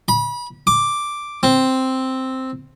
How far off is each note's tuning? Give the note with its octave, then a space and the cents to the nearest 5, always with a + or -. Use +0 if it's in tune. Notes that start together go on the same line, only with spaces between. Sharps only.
B5 -30
D6 +0
C4 +0